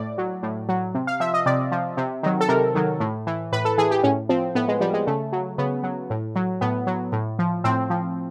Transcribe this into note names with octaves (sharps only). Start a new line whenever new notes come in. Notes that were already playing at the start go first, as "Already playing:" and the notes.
Already playing: A2 D5
F#3
A2
F#3
C3
F5
F3 E5
D#5
C3 D5
F3
C3
D#3 F#3
A4
C3 A#4
D#3 F#3
A2
E3
A2 B4
A4
E3 G#4
G4
A2 C#4
F3 C4
A2 B3
G#3
F3 G3
G#3
C#3 A3
F#3
C#3 B3
F#3
A2
F#3
A2 B3
F#3
A2
F3
A2 C4
F3